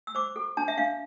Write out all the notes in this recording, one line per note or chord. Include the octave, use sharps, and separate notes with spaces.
E6
C5 D6
A4
D4 A5
E5
D4 F5